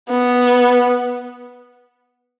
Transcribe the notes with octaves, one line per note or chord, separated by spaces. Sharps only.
B3